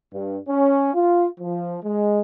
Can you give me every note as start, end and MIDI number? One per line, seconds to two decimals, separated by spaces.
0.12 0.38 43
0.48 0.92 61
0.94 1.28 65
1.40 1.78 53
1.84 2.20 56